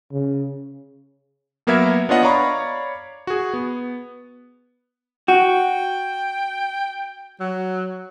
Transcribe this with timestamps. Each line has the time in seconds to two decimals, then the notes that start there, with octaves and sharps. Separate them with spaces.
0.12 C#3
1.67 F#3 A#3 B3 A#4 E5 G#6
2.09 B3 D4 F4 C#5 D#5 F#5
2.23 C#5 D5 F5 A#5 B5 C#6
3.27 F#4 G#4
3.53 B3
5.28 F#4 G5
7.40 F#3